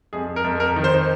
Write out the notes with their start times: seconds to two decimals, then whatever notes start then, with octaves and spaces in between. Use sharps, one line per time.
0.13 F2 G#4
0.36 A#4
0.44 F2
0.60 A#4
0.76 D#3
0.84 C5